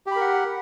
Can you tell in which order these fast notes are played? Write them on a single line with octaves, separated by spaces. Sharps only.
G4 B5 A#4 F#5